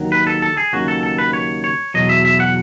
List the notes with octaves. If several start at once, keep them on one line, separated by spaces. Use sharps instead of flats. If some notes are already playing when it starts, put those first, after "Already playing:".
Already playing: D#2 D#3 F#3
B4
A4
A4
G#4
D#2 C#3 F#3 F#4
A4
A4
B4
C#5
C#5
E2 B2 F#3 D#5
E5
E5
F#5